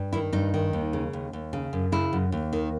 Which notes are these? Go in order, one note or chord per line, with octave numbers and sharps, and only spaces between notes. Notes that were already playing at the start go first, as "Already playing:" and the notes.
Already playing: G2
D#3 E4
G2 D#4
D#3
D#2
C#3
D#2
D#2
C#3
F#2
C#3 E4
F#2
D#2
D#3